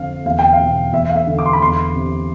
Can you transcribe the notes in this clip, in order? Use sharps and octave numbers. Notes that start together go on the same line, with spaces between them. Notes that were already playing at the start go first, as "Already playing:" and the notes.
Already playing: F2 D3 F5
E2 F5
G5
F5
B2
E2 E5
F5
E5
D3
D6
C6
B5
E2 C6
C3